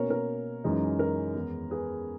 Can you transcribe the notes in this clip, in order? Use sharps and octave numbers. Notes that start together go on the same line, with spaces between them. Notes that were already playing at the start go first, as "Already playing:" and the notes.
Already playing: B2 A#3 C#4 A#4 C#5
A#4
F#2 E3 G#3 D#4
A#4
E2 D#3 G#3 B3
G#4 B4